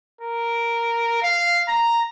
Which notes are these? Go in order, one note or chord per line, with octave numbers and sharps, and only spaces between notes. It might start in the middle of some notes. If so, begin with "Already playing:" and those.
A#4
F5
A#5